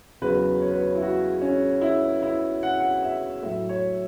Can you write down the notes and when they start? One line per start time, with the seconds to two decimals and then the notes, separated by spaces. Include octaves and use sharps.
0.22 E2 C#3 F#3 B4
0.61 C#5
0.71 B4
0.80 C#5
0.95 E4
1.02 F#4
1.41 C#4
1.81 E4
2.22 E4
2.63 F#5
2.80 F#5
3.03 E5
3.43 A2 F#3 E5
3.69 C#5